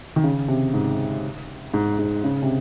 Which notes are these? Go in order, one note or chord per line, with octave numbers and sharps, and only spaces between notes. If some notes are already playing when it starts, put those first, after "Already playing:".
D#3
C#3
C3
G#2
G#2
G#2
C#3
C3